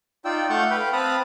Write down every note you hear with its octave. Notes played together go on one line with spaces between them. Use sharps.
D#4 F4 D5 G5 E6
A3 F5 F#5 C#6 G6
B4 F5 G5 B5
C4 F5 A5 B5 D#6 F#6